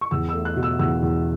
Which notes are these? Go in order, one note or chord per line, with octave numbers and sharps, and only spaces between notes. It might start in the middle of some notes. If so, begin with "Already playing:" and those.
C#6
E2 E6
E6
A3
F#6
B2
E6
E2 E6
E2